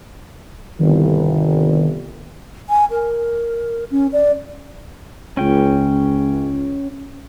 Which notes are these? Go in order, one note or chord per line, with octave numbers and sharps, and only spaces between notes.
G1 C2 D#3
G#5
A#4
C#4
D5
C#2 C#4 G5